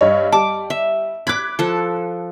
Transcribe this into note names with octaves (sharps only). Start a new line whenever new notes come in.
G2 C#5 D#5
G3 A5 D6
E5
B5 D6 F#6 G#6 B6
F3 A4